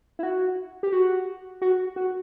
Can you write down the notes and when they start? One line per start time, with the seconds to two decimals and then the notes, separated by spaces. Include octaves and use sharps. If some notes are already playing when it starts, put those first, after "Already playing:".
0.19 E4
0.23 F#4
0.83 G4
0.92 F#4
1.62 F#4
1.96 F#4